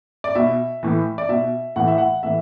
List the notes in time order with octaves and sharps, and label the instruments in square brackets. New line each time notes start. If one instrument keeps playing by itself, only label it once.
[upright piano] D5
B2 E5
A2 E3
D5
B2 E5
A2 E3 F#5
E5
F#5
A2 E3 E5